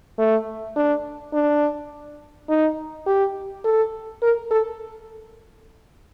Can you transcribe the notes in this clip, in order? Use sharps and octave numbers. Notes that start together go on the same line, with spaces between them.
A3
D4
D4
D#4
G4
A4
A#4
A4